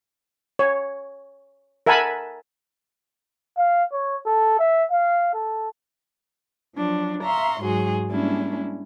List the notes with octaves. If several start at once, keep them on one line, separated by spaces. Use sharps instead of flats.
C#5
A#4 E5 F#5 G#5 A5 B5
F5
C#5
A4
E5
F5
A4
F3 F#3 D4
E5 F5 A#5 C6 C#6
G#2 F#3 F#4 G#4 C6
G3 G#3 A#3 C#4 D4 E4